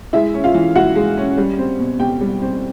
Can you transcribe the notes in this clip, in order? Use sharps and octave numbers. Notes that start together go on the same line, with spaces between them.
G#3 E4 E5
C#4
F4 F5
E3
E4 F#4 F#5
G#3
C#4
G3
C4
B2
B2 G4 G5
G3
C4